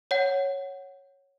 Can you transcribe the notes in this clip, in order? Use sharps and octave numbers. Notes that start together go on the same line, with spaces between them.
C#5 F#5